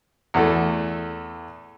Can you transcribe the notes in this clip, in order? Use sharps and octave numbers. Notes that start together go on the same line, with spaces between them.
E2 A3